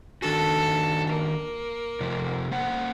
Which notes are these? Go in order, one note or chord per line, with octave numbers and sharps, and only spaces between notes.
D#3 D4 F#4 A4
A#3
C3 F3
A#3 C5 F#5